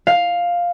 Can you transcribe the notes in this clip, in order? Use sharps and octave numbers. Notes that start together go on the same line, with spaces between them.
F5